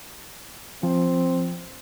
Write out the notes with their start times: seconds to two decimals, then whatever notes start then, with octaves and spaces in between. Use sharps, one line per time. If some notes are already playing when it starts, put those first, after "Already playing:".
0.83 F3 C4